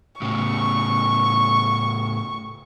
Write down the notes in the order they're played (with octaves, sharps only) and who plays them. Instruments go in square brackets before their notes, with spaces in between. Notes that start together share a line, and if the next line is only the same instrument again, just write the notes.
[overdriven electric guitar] A2 C#3 [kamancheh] C#6